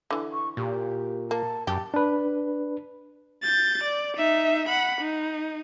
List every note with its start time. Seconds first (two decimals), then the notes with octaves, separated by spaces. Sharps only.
0.11 D3 E3
0.33 C#6
0.57 A#2 G4
1.31 A#3 A5
1.67 F#2 G4 A5
1.94 D4 B4
3.43 G6 A6
3.84 D5
4.17 D#4 E5
4.69 F#5 B5
5.01 D#4